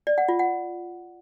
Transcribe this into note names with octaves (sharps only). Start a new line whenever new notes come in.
D5
F#5
F4
F#5